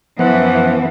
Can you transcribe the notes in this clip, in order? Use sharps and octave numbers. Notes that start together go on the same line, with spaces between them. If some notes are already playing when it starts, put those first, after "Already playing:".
F#2 E3 F3 B3 F#5